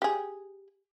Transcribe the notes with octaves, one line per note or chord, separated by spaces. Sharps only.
G4 G#4